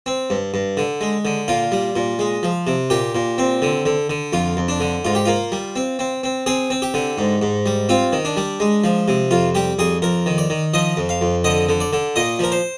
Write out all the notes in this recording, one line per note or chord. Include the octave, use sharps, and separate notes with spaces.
C4
G2
G2
D3
G#3
D3
A#2 F4
G3
A#2
G#3
F3
C3
A#2 G4
A#2
C4
D3
D3
D3
F2 F4
F2
D4
D3
G#2 F4
G4
A#3 F4
G3
C4
C4
C4
C4 G#4
C4
G4
D3
G#2
G#2
G3
C4 F4
D#3
D4
G3
G#3
F3
C3
F2 F4
G3 G4
F2 G#4
F2 A#4
D#3
D5
D#3
F3 D#5
F2
F5
F2
D3 D#5
D3
D5
D3
A#2 D#5
F3 A#4
C5